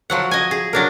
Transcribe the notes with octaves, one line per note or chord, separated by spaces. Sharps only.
F3 F#3 F#5
D#5 G#5
G#4
F#3 D4 A#4